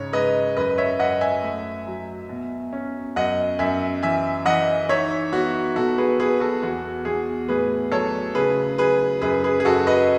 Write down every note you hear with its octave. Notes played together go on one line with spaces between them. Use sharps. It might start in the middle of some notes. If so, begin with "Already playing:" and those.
Already playing: G#2 C#3 C#5
G#3 B4 D#5
F#2 B4 D#5
C#5 E5
F#2 D#5 F#5
E5 G#5
A3
F#3
B2
C#4
F#2 D#5 F#5
F#2 E5 G#5
E3 E5 G#5
E3 D#5 F#5
D#4 C#5 E5
B3 F#4
B2 F#4 A4
G#4 B4
B2 G#4 B4
F#4 A4
E2 F#4
E2 G#4
A2 G#4 B4
F#3 A4 C#5
C#3 G#4 B4
F#3 G#4 B4
F#2 G#4 B4
G#4 B4
G#4
F#2 F#4 A4
B4 D#5